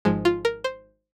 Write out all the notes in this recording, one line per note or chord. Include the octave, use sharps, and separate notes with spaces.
G#1 G#2 F3 G#3
F4
A#4
C5